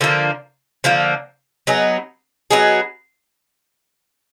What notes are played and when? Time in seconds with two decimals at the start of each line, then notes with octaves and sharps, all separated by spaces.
0.01 D3 F3 A#3
0.84 D3 F3 A#3
1.67 F#3 B3 D#4 G#4
2.51 F#3 B3 D#4 G#4